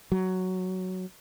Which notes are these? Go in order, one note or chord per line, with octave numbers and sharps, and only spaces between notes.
F#3